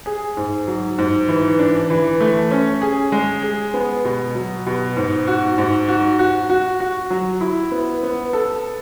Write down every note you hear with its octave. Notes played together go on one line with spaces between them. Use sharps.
G#4
G#2
F#3
G#2
E3
D4
E3
A3
C#4
G#4
G#3
G#4
B3
B2
F#3
B2
G#2
F#4
G#2
F#4
F#4
F#4
F#4
F#3
E4
B3
B3
A4